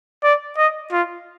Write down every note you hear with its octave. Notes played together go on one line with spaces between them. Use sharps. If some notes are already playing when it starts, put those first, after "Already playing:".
D5
D#5
F4